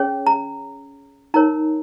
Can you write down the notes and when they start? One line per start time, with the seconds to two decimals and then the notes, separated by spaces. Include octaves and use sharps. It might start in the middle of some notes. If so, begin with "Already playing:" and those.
Already playing: C#4 G#4 C#5
0.27 A#5
1.34 D#4 A#4 C#5 A#5